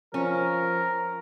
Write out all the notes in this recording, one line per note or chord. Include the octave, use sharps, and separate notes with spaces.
F3 C#4 A#4